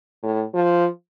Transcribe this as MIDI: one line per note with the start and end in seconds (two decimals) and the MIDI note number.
0.23 0.43 45
0.54 0.87 53